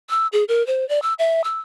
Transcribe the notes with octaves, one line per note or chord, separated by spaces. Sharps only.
E6
G#4
A#4
C5
D5
E6
E5
E6